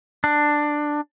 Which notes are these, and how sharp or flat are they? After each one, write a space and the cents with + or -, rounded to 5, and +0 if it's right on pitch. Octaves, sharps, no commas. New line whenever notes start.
D4 +10